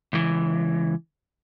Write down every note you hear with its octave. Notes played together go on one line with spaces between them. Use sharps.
C#2 E3